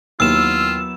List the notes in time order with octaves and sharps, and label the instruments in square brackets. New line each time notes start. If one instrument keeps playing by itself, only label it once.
[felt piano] D#2 [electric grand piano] F#3 B3 E4 [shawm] F4 [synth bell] E6 E7